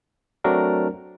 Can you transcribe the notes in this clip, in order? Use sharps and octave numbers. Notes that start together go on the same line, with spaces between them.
F#3 A3 C4 D4 F#4 A#4